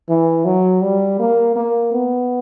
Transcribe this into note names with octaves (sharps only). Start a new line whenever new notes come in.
E3
F#3
G3
A#3
A#3
B3